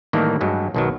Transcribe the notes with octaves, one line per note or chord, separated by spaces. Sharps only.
A2 D#3 E3 G3 A#3
G2 F#3 G#3
B1 D#3 F#3